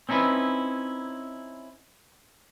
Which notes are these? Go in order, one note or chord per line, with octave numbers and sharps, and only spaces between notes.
C4 C#4 D#4 E4 B4